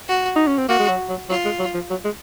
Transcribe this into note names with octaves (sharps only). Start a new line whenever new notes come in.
F#4
D#4
C#4
C4
A#3 F#4
G#3
F#3
F#3
F#3 F4
G#3
F#3
F3
F#3
G#3